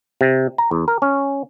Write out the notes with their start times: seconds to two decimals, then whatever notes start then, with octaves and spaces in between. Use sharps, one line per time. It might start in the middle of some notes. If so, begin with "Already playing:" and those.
0.21 C3
0.58 A#5
0.71 E2
0.88 A#4
1.02 C#4